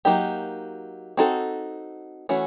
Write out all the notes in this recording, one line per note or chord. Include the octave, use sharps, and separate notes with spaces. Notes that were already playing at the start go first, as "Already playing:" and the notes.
F#3 A#3 D#4 G4
C4 D#4 F#4 A4
E3 A3 C#4 F#4